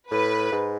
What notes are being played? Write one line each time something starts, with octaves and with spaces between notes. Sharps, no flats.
A2 B4
G#2